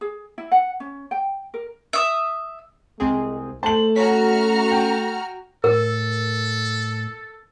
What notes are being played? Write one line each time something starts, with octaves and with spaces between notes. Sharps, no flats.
G#4
E4
F#5
C#4
G5
A#4
E5 D#6
C2 G#3 C4 G#4
A3 C5 A5 F#7
C#4 F#4 A#5 F6 B6
G5
A2 A4 A#4